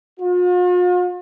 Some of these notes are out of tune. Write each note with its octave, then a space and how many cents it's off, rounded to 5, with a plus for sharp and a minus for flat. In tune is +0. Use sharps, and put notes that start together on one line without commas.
F4 +45